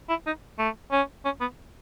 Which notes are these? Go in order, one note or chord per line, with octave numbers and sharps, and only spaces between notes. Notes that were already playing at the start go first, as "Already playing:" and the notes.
E4
D#4
A3
C#4
C#4
B3